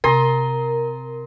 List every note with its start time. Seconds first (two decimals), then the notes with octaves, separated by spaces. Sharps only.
0.04 C3 A#4 A#5 C6